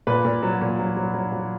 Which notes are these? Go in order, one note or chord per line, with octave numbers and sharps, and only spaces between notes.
A#2 B4
A#2
F#3
A#2
F#3
F#3
F#3
F#3